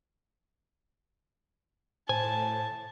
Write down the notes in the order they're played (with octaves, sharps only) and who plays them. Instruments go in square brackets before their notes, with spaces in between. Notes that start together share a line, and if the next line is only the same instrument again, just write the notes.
[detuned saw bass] A2 [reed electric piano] C5 [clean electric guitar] G#5 [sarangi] A5